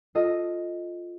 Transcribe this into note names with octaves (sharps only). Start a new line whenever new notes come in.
F4 A4 D#5